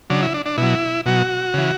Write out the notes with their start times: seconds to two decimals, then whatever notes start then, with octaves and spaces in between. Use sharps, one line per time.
0.10 C#3 F#3 D4
0.22 E4
0.34 D4
0.46 D4
0.58 B2 E4
0.63 F#3
1.06 B2 F#3 F#4
1.54 C#3 E3